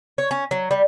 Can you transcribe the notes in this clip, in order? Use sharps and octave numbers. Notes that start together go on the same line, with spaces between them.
C#5
C#4
F#3
G3